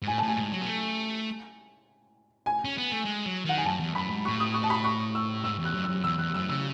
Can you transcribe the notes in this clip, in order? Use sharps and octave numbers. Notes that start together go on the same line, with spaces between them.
G#2
A2 G#5
A2 A5
G#5
G#2
F#3
B3
A3
G#5
C#4
B3
A3
G#3
F#3
D#3 F#5
G#5
F#2 A5
E2
F#2 B5
G#2
A2 C#6
D#6
C#6
A5
B5
C#6
E6
G#2 E6
E2
F#6
F#2
E6
F#2
E2 E6
E2 F#6
F#2 E6
C#3 E6